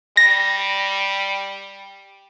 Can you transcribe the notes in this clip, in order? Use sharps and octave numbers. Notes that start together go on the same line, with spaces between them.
G3 A#6